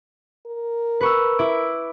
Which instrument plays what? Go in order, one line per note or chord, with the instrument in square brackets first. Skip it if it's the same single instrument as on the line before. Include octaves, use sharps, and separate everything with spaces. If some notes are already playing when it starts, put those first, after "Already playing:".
[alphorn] A#4
[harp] B4 C#6 E6
E4 D6